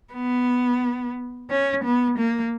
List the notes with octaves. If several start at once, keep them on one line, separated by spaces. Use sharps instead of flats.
B3
C#4
B3
A#3